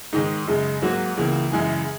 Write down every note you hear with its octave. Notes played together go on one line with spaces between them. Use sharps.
G#2 D#3 G#3 D#4
F#2 C#3 G#3
G#2 F#3 A#3 F#4
C#2 C#3 E3 A#3
F#2 C#3 E3 G#3 G#4